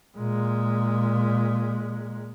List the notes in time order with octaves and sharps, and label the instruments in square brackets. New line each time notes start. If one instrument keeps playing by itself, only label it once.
[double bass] A#2 G#3